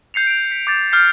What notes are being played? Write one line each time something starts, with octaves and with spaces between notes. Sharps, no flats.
G6 C7 C#7 F7
D7 F7
B6
D6 G6 A6
D6 F6 G6 C7